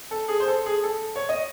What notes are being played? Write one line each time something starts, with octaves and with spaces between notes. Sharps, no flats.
A4
G#4
C5
A4
G#4
A4
C#5
D#5